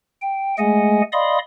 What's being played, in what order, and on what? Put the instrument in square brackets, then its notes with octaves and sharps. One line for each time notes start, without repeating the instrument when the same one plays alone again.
[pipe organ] G5
G#3 A3 G#4 D#5 F#5 G#5
D5 D#5 F5 B5 C6 D#6